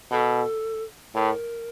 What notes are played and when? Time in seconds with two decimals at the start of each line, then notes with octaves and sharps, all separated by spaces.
0.11 B2 A4
1.14 A2 A#4